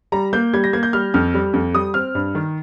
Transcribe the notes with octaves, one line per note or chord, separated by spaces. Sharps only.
G3 A#5
A#3 G6
G3 G#6
A#6
A#3 G#6
G6
G3 F6
F2 F6
G3
F2
G3 D#6
C4 F6
G2
D#3